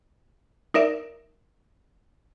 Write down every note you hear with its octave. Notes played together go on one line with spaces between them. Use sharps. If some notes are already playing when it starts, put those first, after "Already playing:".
D#4 A#4 D5 E5